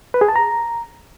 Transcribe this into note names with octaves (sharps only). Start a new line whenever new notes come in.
B4
G#4
A5
A#5